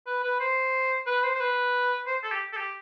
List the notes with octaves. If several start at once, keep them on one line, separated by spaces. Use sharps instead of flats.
B4
B4
C5
B4
C5
C5
B4
C5
A4
G4
A4
G4